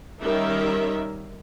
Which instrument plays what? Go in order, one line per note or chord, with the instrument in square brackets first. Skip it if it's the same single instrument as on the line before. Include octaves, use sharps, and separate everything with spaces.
[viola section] D#3 G3 C#4 A#4 E5